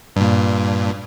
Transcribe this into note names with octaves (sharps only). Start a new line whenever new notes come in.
G2 A#2